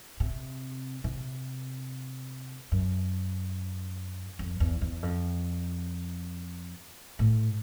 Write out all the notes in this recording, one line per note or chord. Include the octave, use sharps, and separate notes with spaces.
C3
C3
F#2
F2
E2
E2
F2
A2